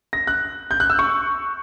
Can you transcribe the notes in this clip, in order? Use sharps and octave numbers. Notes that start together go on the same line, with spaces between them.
A#6
F#6
G6
F#6
E6
C#6